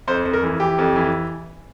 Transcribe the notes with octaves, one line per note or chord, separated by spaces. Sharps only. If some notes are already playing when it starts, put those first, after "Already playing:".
F2 C5
F2
A#4
E3
E3 G4
F2
E3